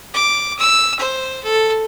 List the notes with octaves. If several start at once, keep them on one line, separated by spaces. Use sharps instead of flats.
D6
E6
C5
A4